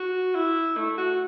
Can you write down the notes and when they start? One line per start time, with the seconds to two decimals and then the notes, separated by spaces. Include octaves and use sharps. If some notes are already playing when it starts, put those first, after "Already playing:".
Already playing: F#4
0.35 E4
0.77 A3
0.98 F#4